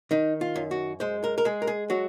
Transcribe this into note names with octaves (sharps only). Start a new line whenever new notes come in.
D#3 D#4
F4
F#2
F#4
G#3 C5
A#4
A#4
G#3 G#4
A#4
G#4
F#3 F#4